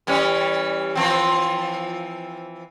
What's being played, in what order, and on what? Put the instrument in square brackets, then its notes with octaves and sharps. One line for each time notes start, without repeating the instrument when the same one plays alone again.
[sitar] E3 G3 C#4
E3 F3 C4